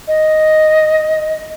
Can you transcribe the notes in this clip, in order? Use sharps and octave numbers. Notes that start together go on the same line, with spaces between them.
D#5